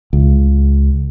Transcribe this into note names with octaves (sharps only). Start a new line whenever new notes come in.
C#2